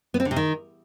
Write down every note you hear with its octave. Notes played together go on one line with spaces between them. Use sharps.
B3
C4
D3
C3
D#3